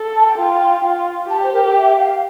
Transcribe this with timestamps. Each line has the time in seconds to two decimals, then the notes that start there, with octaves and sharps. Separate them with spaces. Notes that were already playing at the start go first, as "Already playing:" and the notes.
Already playing: A4
0.15 A5
0.26 G5
0.37 F4
0.84 F4
1.29 G4 A5
1.41 C5
1.53 A#4
1.65 A4
1.76 E5
1.99 F5